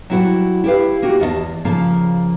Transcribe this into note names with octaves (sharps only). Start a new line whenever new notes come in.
F#3 G3 E4 F#4 F#5
E4 G4 B4 F5
A#3 F#4 G4
E2 D#5 E5 A5
C#3 F3 A#3 A5